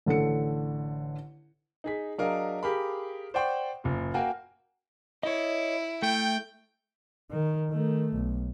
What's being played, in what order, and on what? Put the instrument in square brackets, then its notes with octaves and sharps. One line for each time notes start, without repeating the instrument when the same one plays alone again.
[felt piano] A1 D3 A4 C#7
[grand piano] D#4 G#4 B6
F#3 D4 G#4 A#4 D#5 F5
G4 G#4 A#4 F5 B5
C5 D5 F#5 G5 C6 C#6
F#1 A#2
A#3 F#4 A#4 F5 G5 G#5
[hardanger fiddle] E4 [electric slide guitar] C#5 D#5
[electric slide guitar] A3 [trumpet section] G5
[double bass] D#3
D#3 A3
B1